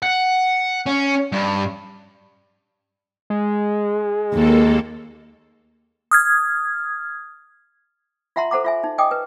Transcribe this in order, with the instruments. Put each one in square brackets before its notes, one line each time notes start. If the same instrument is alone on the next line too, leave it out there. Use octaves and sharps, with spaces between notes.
[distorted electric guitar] F#5
C#4
G2
[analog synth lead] G#3
[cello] D#2 [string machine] A#3 A4
[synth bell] D#6 F6 G#6
[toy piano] F4 E5 F#5 A#5 C6
A4 C5 F#5 A#5 D6
F4 E5 G#5
D#4
D#5 G5 G#5 D6 D#6
B4